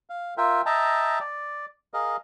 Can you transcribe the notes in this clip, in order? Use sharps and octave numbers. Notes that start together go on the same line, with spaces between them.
F5
F4 A#4 E5 G5
D#5 E5 G5 A5 A#5
D5
G#4 A#4 D#5 F5